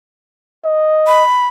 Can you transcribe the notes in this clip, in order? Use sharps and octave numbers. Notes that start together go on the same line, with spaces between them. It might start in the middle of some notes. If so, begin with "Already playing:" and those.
D#5
B5